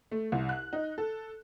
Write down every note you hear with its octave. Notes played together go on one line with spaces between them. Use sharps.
A3
C2
F#6
D#4
A4